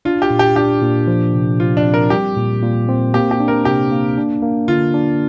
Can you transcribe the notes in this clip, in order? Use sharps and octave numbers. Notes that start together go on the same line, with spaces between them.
D4 F4
G4
A#2
G4
D4 G4
A#2
F3
C3
F3 F4
D4
C4
A#4
G3 G4
A#2
A#2
C4
A#3 G4
G4
D4
A#4
C3 G4
A#3
D4
A#3
D3 F4
D4